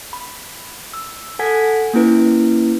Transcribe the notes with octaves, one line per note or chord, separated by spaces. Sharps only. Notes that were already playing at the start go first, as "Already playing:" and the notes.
B5
E6
A4 F#5 G#5 G#6 B6
A#3 C#4 E4 B4 D7